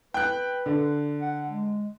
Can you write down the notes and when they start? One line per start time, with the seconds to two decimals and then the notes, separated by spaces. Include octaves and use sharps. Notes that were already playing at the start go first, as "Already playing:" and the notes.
0.14 B4 G5 F#6
0.66 D3
1.20 F#5
1.48 G#3